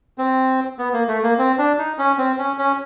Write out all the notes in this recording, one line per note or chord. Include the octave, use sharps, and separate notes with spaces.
C4
B3
A#3
A3
A#3
C4
D4
D#4
C#4
C4
C#4
C#4